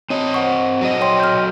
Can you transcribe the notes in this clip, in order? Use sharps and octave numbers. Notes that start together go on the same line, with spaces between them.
C4 C#5 D#5
C5 F#5 C#6
F#3 D#5
C#5 G5 C6
F6 G6